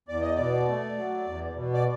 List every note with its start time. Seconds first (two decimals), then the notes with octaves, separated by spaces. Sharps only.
0.08 E2 D5
0.22 D#5
0.34 B2 D5
0.68 A3
0.97 F#3
1.26 E2
1.55 B2
1.74 D5